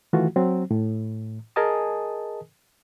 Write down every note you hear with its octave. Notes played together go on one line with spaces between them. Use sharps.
D#3 E3 A3 F4 F#4
F#3 C4
A2
G#4 A#4 D#5 G#5 A5 D#6